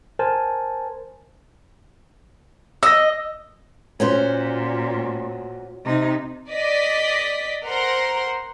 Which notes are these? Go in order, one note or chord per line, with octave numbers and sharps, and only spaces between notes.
A#4 C5 G#5 A5
D#5 E6 A#6
A#2 C#4 F#4 C5
C3 D#4
D5 D#5 B6
A#4 C5 F#5 A#5 C6